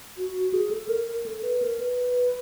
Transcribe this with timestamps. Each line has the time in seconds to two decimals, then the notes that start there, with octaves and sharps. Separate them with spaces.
0.18 F#4
0.53 G#4
0.71 A4
0.89 A#4
1.08 A#4
1.26 A4
1.43 B4
1.62 A#4
1.80 B4